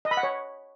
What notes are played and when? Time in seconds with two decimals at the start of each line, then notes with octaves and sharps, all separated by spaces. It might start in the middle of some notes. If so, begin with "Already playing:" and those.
0.05 D#5
0.11 B5
0.17 F#5
0.23 C#5